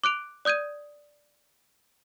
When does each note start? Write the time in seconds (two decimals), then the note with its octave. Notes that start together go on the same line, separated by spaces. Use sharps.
0.04 D6 F#6 D7 F7
0.45 D5 D#6 G6 G#6 D#7